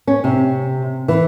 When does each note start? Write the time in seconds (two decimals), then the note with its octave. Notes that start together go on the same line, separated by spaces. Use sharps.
0.07 C#4
0.24 C3
1.08 E3